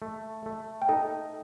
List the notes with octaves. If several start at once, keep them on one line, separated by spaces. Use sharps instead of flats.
A3
A3
G5
D#4 A4 A5